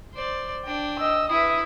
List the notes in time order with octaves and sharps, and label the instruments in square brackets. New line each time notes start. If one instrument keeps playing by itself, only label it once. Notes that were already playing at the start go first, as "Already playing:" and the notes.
[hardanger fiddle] C5 D5
D4 G5
[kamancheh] D#5 E6
[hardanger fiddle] E4 B4 [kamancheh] E5 D#6